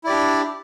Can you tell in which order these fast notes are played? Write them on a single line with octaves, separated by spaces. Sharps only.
E4 D5 G4 D4